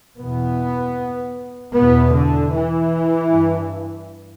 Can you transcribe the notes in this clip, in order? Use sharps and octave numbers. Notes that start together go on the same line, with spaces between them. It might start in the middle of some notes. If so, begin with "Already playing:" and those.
E2 B2 B3
E2 B2 B3
D3
E3
G2